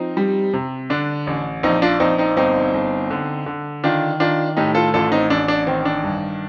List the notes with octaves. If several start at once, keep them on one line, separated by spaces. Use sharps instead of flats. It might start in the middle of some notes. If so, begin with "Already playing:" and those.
Already playing: F3 C4 D#4
G3
C3
D3 D4
A1
A#1 C4 D#4
D4 F4
A#1 C4 D#4
C4 D#4
G1 C4 D#4
G1
D3
D3
D#3 D4 F4
D#3 D4 F4
A2 D#4 G4
F4 A4
A1 F4 A4
C4 D#4
A1 D4
D4
D#3 C4
D4
G2